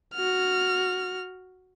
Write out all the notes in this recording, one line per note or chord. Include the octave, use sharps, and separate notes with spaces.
F#4 F6